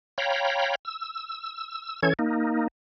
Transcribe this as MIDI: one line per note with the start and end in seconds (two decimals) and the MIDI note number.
0.18 0.75 73
0.18 0.75 77
0.18 0.75 79
0.18 0.75 82
0.18 0.75 83
0.85 2.00 88
2.03 2.13 52
2.03 2.13 61
2.03 2.13 69
2.03 2.13 73
2.03 2.13 92
2.19 2.68 58
2.19 2.68 63